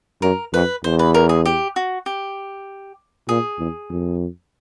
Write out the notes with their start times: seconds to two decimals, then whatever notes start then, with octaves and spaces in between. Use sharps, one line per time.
0.22 F#2 A#4
0.53 F2 B4
0.84 E2 C5
0.99 B4
1.14 A#4
1.29 G#4
1.46 G4
1.76 F#4
2.06 G4
3.29 A#2 G#4
3.59 E2
3.90 F2